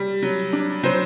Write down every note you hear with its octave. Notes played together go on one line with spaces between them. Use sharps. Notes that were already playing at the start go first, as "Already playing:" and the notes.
Already playing: G3
F#3
D4
F#3 C5